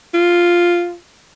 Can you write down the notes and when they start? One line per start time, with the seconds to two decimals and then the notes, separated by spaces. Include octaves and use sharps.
0.14 F4